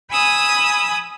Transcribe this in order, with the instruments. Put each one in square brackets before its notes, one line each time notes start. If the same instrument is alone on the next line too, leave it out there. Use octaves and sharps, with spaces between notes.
[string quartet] G#5 B5 D#6 E6